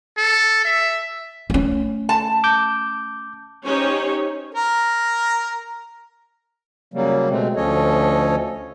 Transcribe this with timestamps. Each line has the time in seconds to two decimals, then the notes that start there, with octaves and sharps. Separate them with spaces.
0.18 A4
0.65 E5
1.50 A3 C#4
2.09 A5
2.44 D6 G6
3.64 C#4 D#4 G4 C5 C#5
4.55 A#4
6.94 C#3 F#3 G3 A#3
7.29 B2 G#3 A3 C4
7.56 D2 F3 C#4 A4 C#5 D#5